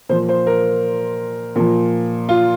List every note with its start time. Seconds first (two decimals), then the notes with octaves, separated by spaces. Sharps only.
0.09 A#2 F3 C5
0.29 C5
0.47 A#4
1.56 A#2 F3
2.29 F4